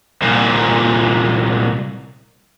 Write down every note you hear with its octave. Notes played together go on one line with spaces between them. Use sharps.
C2 A#2